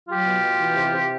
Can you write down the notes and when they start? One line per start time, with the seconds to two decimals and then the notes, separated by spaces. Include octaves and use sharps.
0.08 F#3 F4 G4
0.26 B2
0.43 B2
0.61 E3
0.77 C3
0.94 C3